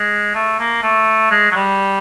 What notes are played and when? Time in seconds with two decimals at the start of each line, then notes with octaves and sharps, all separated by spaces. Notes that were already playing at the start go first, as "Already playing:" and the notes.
Already playing: G#3
0.35 A3
0.59 A#3
0.83 A3
1.31 G#3
1.51 F#3
1.56 G3